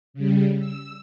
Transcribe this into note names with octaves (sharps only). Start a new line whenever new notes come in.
C#3 G3
E6